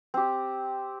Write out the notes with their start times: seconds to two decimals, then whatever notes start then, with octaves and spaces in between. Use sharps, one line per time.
0.14 C4 G4